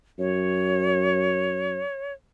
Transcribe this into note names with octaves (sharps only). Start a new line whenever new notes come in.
F#2 C#5